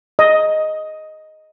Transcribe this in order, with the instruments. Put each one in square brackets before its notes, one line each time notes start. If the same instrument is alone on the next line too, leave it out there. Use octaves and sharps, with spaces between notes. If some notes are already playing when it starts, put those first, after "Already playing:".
[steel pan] D#5